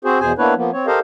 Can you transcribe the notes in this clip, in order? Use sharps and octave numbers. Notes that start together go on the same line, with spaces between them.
C4 F#4 G#4 C5
E2 B2 G#4 C5 G#5
A#3 B3 D4 E4 B4 C#5
F3 A#3 B3
C4 C#5
G4 A4 A#4 C5 D#5 F5